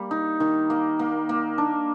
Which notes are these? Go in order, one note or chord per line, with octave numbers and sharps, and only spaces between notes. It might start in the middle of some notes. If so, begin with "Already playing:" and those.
Already playing: G3 A#3
D#4
D#3
A#3
A#3
A#3
D4